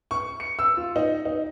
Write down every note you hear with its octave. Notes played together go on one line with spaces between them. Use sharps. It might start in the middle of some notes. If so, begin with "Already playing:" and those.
C#6
C#7
E6
F4
D#4
D#4